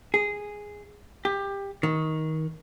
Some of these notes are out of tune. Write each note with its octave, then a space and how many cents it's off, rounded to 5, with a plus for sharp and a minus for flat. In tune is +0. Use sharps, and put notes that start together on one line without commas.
G#4 -5
G4 +20
D#3 +20